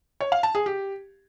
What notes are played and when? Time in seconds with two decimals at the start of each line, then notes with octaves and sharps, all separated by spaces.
0.21 C#5
0.32 F5
0.43 A5
0.55 G#4
0.66 G4